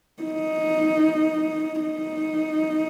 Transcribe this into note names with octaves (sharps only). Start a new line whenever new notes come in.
D#4
D#4